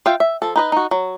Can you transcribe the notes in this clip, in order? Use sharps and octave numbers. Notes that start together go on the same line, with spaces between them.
F4 E5 F5 G5
E5
F3 A4
D#4 B4 D#5
D#4 F#4
F#3